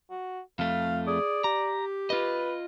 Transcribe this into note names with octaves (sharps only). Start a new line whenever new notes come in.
F#4
F2 A3 F5
G#4 D5
G4 A#5
F4 B4 D#5